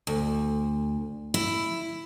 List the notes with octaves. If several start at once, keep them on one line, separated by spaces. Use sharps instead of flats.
D2
E4